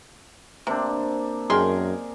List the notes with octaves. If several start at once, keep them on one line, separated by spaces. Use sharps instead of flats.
C3 A#3 C4 D4
F#2 D#3 G#4 A#4 G5 C6